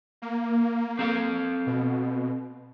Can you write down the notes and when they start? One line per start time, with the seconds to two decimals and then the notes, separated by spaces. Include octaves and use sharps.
0.22 A#3
0.99 C4 A4 F5
1.67 B2